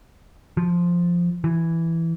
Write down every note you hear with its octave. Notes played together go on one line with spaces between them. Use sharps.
F3
E3